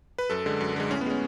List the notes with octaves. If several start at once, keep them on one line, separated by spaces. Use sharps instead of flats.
B4
F#2 A4
D3 G#3
F#2
D3 G#3
A2 C#4
B3
G#3 C#4